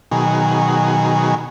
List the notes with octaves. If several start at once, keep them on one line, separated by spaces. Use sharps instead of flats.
B2 D#3 F#3 G#4